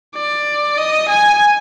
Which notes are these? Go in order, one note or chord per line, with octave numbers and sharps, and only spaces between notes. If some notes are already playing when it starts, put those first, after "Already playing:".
D5
D#5
G#5